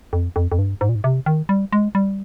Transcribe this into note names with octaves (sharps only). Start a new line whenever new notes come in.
F2
F2
F2
G2
G#2
A#2
G#2
C3
D#3
G3
G#3
G3